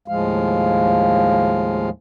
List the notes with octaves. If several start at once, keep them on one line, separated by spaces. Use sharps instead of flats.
D#2 A2 F3 G#3 F5